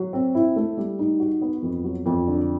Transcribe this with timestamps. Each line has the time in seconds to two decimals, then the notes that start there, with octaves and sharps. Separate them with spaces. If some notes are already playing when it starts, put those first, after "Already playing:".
Already playing: F#3
0.13 C4
0.35 E4
0.56 A3
0.77 G3
0.99 D#4
1.20 F#4
1.41 B3
1.62 F2
1.84 F#3
2.06 F2
2.27 D3